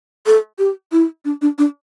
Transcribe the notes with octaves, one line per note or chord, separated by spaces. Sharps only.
A4
G4
E4
D4
D4
D4